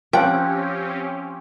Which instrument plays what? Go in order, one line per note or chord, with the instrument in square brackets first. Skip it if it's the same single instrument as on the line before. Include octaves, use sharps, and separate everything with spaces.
[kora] F3 F#5 [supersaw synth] C4 C#4 G4 [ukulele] G5